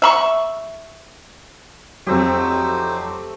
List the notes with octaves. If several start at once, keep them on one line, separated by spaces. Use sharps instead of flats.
E5 B5 C#6
F2 F#3 A3 C4 D#4 G4 C5